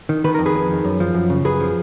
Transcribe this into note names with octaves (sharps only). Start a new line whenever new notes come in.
D#3
D#3 B4
F2 A#4
G#4 B4
F2
D#3
F#2
F3
F#2
C#3
F#2 G#4 B4
F3